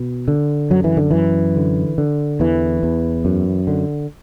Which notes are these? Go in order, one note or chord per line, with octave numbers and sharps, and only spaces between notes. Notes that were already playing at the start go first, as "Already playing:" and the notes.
Already playing: B2
D3
F#2 F#3
E3
D3
F#2 E3
D3
D3
E2 E3
E2
F#2
D3